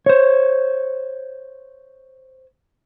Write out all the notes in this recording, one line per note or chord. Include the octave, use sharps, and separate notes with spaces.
C5 C#5